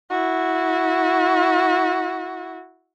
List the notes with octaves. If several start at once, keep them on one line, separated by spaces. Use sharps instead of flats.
E4 F#4